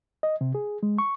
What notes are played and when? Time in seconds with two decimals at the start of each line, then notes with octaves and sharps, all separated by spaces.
0.23 D#5
0.41 C3
0.55 G#4
0.83 G#3
0.98 C#6